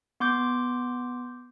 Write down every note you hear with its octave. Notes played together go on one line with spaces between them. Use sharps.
B3 C6 D6 G6